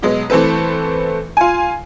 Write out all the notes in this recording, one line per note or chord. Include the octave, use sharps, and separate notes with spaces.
B2 F#3 G#3 B3
E3 A3 C4 A4 B4
F4 G#5